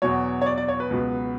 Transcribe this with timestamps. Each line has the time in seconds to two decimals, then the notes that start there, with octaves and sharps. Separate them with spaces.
0.02 E2 B2 F#3 C#5
0.41 C#5
0.46 D5
0.58 D5
0.68 C#5
0.80 B4
0.91 C#2 B2 F#3